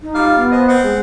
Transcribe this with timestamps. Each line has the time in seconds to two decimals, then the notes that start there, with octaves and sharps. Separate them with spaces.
0.02 D#4
0.15 G3 F4 F5
0.36 B3
0.51 F3 C5 D#5
0.67 C4 F#5
0.83 G#3